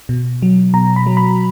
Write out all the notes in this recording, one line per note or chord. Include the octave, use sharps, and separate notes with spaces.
B2
F#3
B2 A#5
B5
F#3
B5